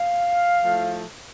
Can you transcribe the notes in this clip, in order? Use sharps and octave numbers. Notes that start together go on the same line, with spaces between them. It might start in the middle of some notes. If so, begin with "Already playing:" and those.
Already playing: F5
A2 F3 A3